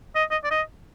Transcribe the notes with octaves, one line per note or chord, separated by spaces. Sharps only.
D#5
D#5
D5
D#5